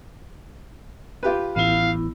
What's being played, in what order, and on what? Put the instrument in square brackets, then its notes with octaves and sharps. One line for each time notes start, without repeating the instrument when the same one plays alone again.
[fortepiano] F4 G4 B4
[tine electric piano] A1 [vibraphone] B3 E4 [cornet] F5